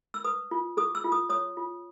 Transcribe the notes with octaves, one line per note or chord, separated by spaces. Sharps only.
E6
B4 D#6
F4
G#4 D#6
E6
F4
D#6
C#5 D#6
F4